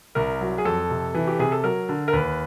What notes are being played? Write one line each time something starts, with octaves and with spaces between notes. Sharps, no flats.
C2 A#4
F#3
G#4
F2 A4
C3
E3
G4
C3 G#4
A4
F#3 A#4
D3
A#4
D#2 B4